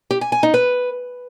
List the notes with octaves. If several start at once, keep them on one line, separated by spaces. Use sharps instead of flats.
G4
G#5
G#5
D#4
B4